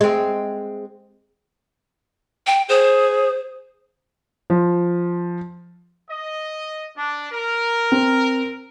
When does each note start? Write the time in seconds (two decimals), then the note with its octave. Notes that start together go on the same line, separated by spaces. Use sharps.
0.01 G#3 C4
2.47 G5
2.69 G#4 C5
4.50 F3
6.10 D#5
6.96 D4
7.32 A#4
7.92 C4